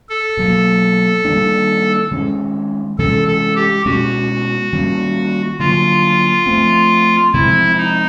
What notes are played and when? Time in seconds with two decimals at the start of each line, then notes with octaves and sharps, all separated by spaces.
0.09 A4
0.37 B2 F#3 A#3
1.25 D#3 G3 A#3 D4
2.11 D#3 G#3 C#4
2.98 C3 E3 G#3 C#4 A4
3.27 A4
3.56 G4
3.86 B2 G#3 C#4 F#4
4.73 D#3 G3 A#3 C#4
5.59 D3 F#3 A#3 F4
6.46 F3 A3 C4
7.33 C3 F3 G#3 C4 E4
7.77 D#4